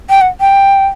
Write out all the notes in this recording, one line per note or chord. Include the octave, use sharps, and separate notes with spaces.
G5
F#5
G5